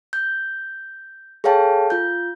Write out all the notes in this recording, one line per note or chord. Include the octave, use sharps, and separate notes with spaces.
G6
G#4 A4 C#5 F5 G5 A5
F4 G6